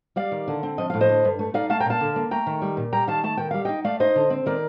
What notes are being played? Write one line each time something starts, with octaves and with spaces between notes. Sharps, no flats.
G3 D5 F5
D#3
D3
C4
F3 D#5
A2 F5
C5 D#5
D3
G2
A3
D#4 D5 F5
A3 F5 A5
G5 A#5
A#2 F5 A5
D3
A#3
A3 G5 A#5
D#3
G3
A#2
G3 G5 A#5
D#3 F5 A5
A3 A5
D#3 G5
G3 F5
D#4 D#5 G5
A3 D5 F5
D#4 C5 D#5
D3
C4
D#3 A#4 D5